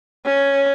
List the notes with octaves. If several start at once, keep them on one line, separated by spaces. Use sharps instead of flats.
C#4